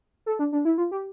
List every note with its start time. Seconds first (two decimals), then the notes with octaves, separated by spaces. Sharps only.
0.26 A4
0.39 D4
0.52 D4
0.65 E4
0.78 F4
0.91 G4